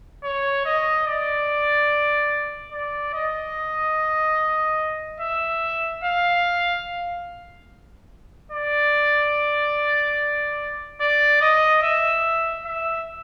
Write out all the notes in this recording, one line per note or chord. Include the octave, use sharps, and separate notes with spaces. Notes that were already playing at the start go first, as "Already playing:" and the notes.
C#5
D#5
D5
D5
D#5
E5
F5
D5
D5
D#5
E5
E5